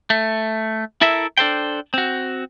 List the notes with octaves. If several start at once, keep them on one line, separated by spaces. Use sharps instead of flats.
A3
E4 A4 A#4 E5
D4 A4 C5 G5
C4 F#4